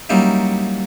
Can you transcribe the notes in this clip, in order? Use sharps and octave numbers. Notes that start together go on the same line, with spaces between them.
F#3 G3 A#3 C#4 D#4 E4